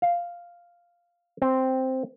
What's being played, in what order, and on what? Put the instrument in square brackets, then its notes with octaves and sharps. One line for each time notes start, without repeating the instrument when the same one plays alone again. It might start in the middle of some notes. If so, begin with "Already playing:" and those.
[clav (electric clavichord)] F5
C4